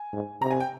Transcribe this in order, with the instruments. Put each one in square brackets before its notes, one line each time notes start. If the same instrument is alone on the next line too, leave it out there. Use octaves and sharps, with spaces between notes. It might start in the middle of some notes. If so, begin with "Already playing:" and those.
Already playing: [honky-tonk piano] G#5
[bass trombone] G#2
[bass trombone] C3 [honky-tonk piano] A#5
[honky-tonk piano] G#5
G5